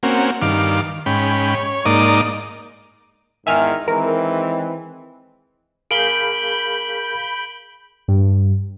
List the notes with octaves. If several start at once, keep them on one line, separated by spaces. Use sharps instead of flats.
A#3 C4 C#4 F#4
G2 D#3 F5 D6
G#2 C#4 G5 B5
C#5
G#2 A#3 D#4 D5 D6 D#6
E2 G#2 D#3 E5 G#5 F6
D#3 E3 G#3 C4 A#4
G#4 A#4 F5 B5 G6 D7 F#7 G7
G2